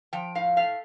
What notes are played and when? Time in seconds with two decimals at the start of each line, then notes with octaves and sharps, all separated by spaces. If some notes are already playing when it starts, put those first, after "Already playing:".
0.13 F3 G5
0.35 A2 F5
0.57 A3 F5